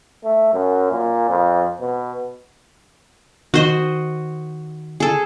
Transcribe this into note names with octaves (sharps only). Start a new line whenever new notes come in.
A3
F#2
A#2
F2
B2
D#3 F#4 C5 D#5
G#4 A4